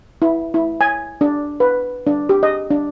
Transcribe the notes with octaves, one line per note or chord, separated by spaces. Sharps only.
E4
E4
G#5
D4
B4
D4
G4
D#5
D4